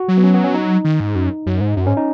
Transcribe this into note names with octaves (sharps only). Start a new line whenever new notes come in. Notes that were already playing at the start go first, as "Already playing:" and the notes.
Already playing: F#4
F#3
B3
C#4
B3
C#4
D#4
D#3
G#2
F#2
F#2
G#2
F#2
G#2 C#4
D#4